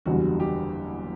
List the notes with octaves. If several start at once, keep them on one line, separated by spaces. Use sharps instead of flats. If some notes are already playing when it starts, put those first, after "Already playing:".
F#1 E2 D3 G3 F#4
G4